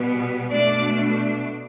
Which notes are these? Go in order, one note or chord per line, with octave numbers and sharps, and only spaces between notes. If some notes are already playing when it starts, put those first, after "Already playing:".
Already playing: B2 G3 B3
B2 A3 D4 D5